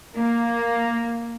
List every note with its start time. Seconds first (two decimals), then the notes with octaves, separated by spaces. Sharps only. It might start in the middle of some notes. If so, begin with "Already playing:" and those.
0.16 A#3